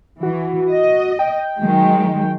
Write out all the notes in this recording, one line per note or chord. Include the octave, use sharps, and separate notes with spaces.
E3 F#4
D#5
G5
D#3 F#3 G#3